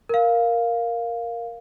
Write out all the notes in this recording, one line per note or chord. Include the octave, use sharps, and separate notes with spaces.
A#4 F5